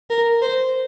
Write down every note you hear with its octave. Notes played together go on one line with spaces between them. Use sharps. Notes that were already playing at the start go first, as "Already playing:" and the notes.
A#4
C5